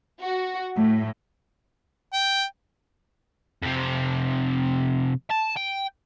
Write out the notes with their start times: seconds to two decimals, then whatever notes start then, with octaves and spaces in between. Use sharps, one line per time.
0.22 F#4
0.74 A2
2.14 G5
3.63 F2 C3
5.30 A5
5.56 G5